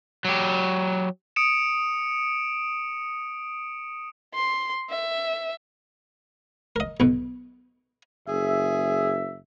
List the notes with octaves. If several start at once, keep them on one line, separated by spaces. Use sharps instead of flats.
F#3 G4
D#6 C#7 D7 E7
C6
E5
A#4 D#5
B1 B2
F#1 G#4 E5